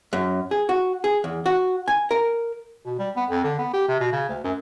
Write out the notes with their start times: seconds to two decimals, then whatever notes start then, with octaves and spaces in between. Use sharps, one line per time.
0.13 F#2
0.51 G#4
0.69 F#4
1.04 G#4
1.24 E2
1.46 F#4
1.88 G#5
2.11 A#4
2.86 B2
2.99 G3
3.16 B3
3.30 F2
3.44 D3
3.59 B3
3.73 G4
3.88 C3
4.00 B2
4.13 C#3
4.29 D2
4.44 F#2